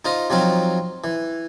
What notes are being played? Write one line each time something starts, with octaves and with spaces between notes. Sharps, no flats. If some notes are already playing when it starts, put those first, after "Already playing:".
D#4 F4 C5 D#5
F3 F#3 C4 D#4 F4
E3